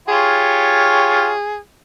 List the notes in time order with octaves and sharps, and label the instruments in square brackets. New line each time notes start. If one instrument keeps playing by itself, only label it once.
[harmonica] F4 G4 C#5 [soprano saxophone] G#4